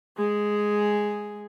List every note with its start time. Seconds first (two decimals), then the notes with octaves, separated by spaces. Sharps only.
0.17 G#3 G#4